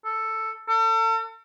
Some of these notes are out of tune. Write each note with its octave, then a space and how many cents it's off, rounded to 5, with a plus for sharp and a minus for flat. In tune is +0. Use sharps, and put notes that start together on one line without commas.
A4 +5
A4 +40